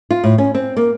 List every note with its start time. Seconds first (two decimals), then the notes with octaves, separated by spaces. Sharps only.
0.11 F4
0.24 A2
0.38 C#4
0.55 C4
0.76 A#3